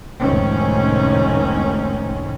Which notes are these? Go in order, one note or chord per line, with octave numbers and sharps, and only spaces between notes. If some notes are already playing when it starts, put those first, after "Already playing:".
F1 C#2 A2 D#3 C4 C#4